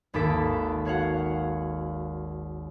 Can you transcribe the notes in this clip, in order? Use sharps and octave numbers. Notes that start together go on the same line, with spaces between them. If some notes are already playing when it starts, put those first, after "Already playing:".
G#1 D#2 A4 D6 B6
F#4 C#5 F5 F#5